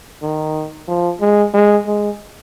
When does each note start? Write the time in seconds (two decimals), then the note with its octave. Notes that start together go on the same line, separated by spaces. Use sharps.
0.22 D#3
0.88 F3
1.21 G#3
1.54 G#3
1.87 G#3